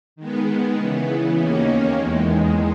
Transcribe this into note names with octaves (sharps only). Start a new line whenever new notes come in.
D#3 G#3 B3
C#3 E3 B3
D#2 D#3 A#3 C#4
E2 D#3 G#3